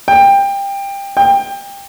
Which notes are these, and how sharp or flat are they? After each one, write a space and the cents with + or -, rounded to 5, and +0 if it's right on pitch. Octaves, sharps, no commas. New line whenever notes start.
G5 +20
G5 +25